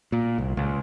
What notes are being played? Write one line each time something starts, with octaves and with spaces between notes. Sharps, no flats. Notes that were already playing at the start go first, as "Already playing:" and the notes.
A#2
C2
C#2